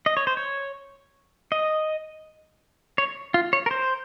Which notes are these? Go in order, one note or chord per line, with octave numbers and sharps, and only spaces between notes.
D#5
C#5
C5
C#5
D#5
C#5
F4
C#5
A#4
C5